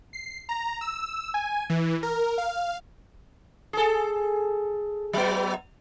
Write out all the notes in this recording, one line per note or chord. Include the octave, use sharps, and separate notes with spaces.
C7
A#5
E6
G#5
E3
A#4
F5
G#4 A4
F#3 B3